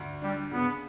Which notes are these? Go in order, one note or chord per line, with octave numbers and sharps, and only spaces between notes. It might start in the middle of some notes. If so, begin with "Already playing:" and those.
Already playing: D2
G3 D4
C#3 B3